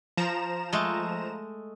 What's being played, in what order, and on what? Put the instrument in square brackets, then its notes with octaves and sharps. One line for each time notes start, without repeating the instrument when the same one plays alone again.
[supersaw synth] F3 A#5 E7
[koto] G#3 A3